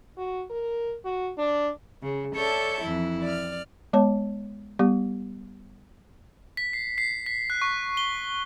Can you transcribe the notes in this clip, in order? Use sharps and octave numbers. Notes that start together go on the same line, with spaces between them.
F#4
A#4
F#4
D4
C#3
A4 C#5 D5 E5 A5 G6
F2 E3 E4
D5 F6
G#3 B3 C#5 A5
G3 B3 G4
B6
C7
C7
B6
F#6
C#6
G7